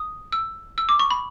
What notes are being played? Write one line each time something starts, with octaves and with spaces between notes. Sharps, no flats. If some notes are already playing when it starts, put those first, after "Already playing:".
Already playing: D#6
E6
E6
D6
C#6
B5